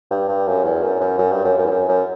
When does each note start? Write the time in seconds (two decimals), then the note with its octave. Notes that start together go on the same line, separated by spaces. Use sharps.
0.11 G2
0.28 G2
0.47 F#2
0.64 E2
0.82 F#2
1.01 F#2
1.18 F#2
1.31 G2
1.44 F#2
1.58 F#2
1.65 E2
1.71 F#2
1.88 F#2